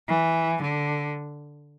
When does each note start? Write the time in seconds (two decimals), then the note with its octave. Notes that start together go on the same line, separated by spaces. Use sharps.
0.08 E3
0.62 D3